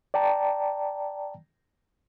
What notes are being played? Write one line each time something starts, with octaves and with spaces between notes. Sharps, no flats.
D5 G5 A5 A#5